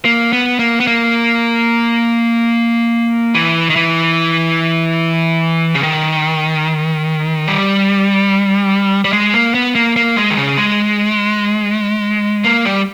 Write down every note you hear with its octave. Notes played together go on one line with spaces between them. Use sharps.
A#3
B3
A#3
B3
A#3
E3
D#3
E3
C#3
D#3
G3
G3
G#3
A#3
B3
A#3
A#3
G#3
D#3
C#3
G#3
A#3
G3